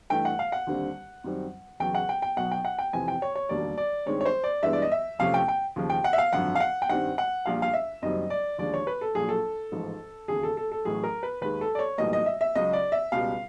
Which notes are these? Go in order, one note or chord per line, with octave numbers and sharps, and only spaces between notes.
G2 E3 A3 G5
F#5
F5
F#5
D#2 D3 G3 C4
F#2 D#3 G3 C4
E2 C#3 F#3 G5
F#5
G5
G5
B1 B2 F#3 B3 F#5
G5
F#5
G5
F2 C3 E3 G#5
G5
C#5
C#5
E1 D#2 D3 G3 A#3 D5
D5
G2 D#3 G#3 C4 C#5
C#5
C5
D5
G2 E3 G#3 B3 E5
D5
D#5
E5
F2 C3 F3 A3 C#4 F5
G5
G5
D#2 C#3 F3
G5
F#5
E5
F5
G#1 F#2 D3 F3 F#5
F5
F#5
G5
G2 D#3 G3 C4 F#5
F#5
A#1 A#2 G3 F5
F5
E5
F#1 F#2 D#3 G3 C4 D#5
D5
D#2 D3 F3 G#3 D5
C#5
B4
A4
A#1 A#2 F#3 G#4
A4
A1 G#2 F3
E1 D#2 C#3 G#4
A4
A4
A4
A1 A2 F#3 G#4
A#4
B4
D#2 D#3 G#3 B4
A4
D5
C#5
B1 A2 E3 G3 A#3 D#5
D#5
E5
E5
C#2 C#3 F#3 D#5
D5
E5
C#2 B2 G3 F5